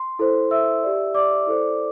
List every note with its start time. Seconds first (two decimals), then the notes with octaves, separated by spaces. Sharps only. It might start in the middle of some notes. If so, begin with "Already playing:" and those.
Already playing: C6
0.19 E4 A4 C5
0.51 E5 E6
0.83 G4 D5
1.14 D5 D6
1.47 E4 A4 C5